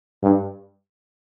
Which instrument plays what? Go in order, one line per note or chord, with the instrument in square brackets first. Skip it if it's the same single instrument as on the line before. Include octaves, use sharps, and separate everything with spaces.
[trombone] G2